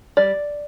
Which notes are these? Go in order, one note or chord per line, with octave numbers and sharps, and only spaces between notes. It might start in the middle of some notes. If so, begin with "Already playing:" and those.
G3 D5